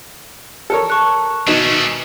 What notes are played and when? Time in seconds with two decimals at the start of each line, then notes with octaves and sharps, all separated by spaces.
0.70 A4 A#4 C#5
0.90 A5 C#6 F#6
1.47 B2 D#3 A3 C#4 D#4 E7